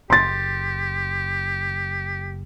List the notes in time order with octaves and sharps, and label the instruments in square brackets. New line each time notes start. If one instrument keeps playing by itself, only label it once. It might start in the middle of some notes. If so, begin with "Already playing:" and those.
[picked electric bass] F#1 [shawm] G4 [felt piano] C6 A6